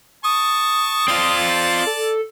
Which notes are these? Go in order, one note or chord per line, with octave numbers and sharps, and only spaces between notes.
A5 C#6 D#6
C4 F4 D5 A5
A4